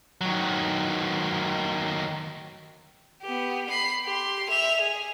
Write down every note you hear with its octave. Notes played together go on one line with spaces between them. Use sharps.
D#3 F#3
B3 G4
B5 C7
G4 C6
E5 F7
G#4